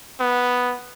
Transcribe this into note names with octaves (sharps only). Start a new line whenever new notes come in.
B3